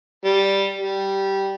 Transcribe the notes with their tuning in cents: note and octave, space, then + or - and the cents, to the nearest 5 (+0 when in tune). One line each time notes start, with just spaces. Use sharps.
G3 +0
G3 -10